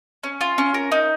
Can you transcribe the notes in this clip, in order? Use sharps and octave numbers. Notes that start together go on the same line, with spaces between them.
C#4
F4
C#4
A#4
D#4